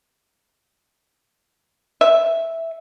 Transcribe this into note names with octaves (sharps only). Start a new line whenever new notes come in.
E5